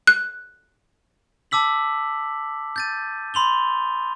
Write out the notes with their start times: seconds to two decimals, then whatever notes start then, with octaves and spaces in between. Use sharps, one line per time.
0.07 F#6
1.51 A5 D6 E6 B6 F#7
2.76 G6 A6 D#7
3.34 B5 C6 F7 G7